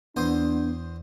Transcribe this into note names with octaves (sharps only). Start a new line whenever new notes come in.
E2 B3 D4 C5 D#6